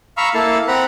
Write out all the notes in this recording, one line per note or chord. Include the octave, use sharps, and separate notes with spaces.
F5 A#5 B5 C#6 E6 F6
A#3 E4 A4 F5 A5
C4 F#5 A#5 B5 F#6